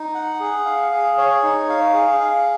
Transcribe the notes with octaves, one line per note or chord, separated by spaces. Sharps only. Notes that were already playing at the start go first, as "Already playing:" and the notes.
Already playing: D#4
F#5
G#4
F5
G#4
C#5
D#4
F5
G#4
F5